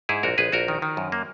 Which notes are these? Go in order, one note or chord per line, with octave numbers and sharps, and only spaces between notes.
G#2 E4 G#4
A#1 F#4 A#4
A#1 G#4 B4
A#1 F#4 A#4
D#3
D#3
F#2
A#3